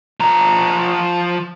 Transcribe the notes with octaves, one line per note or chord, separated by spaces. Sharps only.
F3 A#5